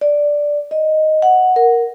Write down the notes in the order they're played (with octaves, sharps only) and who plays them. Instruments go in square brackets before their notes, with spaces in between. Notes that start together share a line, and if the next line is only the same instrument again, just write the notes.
[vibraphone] D5
D#5
F#5
A#4